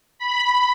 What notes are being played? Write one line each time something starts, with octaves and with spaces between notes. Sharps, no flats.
B5